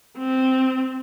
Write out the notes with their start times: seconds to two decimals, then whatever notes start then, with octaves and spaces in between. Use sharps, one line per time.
0.18 C4